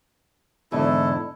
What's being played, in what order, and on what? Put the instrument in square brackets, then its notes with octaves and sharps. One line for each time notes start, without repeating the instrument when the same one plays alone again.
[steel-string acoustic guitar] E2 G#2 D3 [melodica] E4 A4